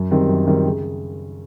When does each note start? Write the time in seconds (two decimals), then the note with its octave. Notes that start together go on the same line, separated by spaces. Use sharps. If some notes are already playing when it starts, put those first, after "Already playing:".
Already playing: F#2
0.11 D#3 G3 C4
0.29 F#2
0.47 D#3 G3 C4
0.65 C#3